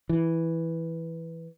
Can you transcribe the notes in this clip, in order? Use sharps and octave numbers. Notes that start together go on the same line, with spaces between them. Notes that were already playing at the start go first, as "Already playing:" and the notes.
E3